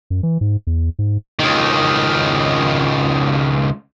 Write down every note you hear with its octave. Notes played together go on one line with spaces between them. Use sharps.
F#2
E3
G#2
E2
G#2
C#2 D#3